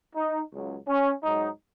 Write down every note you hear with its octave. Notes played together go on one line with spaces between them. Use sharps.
D#4
C#2 C#3 F#3
C#4
G#2 F#3 D#4